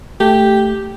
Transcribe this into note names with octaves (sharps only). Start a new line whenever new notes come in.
A3 G4